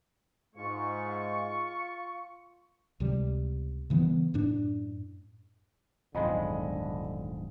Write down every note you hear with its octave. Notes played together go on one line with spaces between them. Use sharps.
G#2 G#3 F4 C#6
C#2 C3 G3
C#3 E3 G3 B3
F#2 A2 D4
D#1 B1 F2 G#2 D3 G#3 D#5 B5